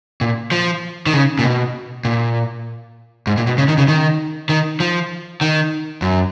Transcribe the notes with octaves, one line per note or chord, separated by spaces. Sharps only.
A#2
F3
D#3
C#3
A#2
B2
A#2
G#2
A#2
B2
C#3
D#3
C#3
D#3
D#3
F3
D#3
F#2